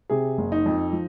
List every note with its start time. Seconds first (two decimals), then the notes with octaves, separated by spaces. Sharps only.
0.10 C3 G#4
0.38 F#1
0.52 D#4
0.66 F2
0.93 F3